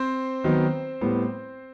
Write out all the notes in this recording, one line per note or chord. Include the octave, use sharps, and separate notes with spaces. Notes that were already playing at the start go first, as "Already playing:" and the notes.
Already playing: C4 C5
D#3 F#3 B3
A2 G3 B3